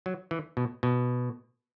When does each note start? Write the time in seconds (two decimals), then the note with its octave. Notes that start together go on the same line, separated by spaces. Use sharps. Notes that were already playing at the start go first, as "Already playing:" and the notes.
0.06 F#3
0.31 E3
0.57 B2
0.83 B2